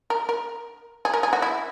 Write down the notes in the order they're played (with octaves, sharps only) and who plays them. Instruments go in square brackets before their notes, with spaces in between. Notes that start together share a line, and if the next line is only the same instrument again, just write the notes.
[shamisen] A#4
A#4
G#4
A#4
G#4
F#4
E4